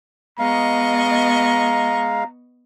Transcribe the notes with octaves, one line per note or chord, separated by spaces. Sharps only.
G#3 B3 D#5 F5 A#5 C#6